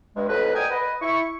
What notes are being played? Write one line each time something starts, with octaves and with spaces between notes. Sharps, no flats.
G2 G#3
F2 A2 B4 D#5
F#4 A#4 D5 D#5 G5 G#5
B4 D#5
E4 C#6